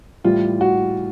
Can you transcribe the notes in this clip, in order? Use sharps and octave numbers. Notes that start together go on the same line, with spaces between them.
A2 E3 G3 F4
F#4